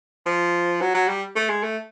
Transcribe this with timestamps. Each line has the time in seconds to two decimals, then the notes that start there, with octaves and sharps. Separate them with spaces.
0.26 F3
0.81 F#3
0.94 F#3
1.08 G3
1.36 A3
1.49 G#3
1.63 A3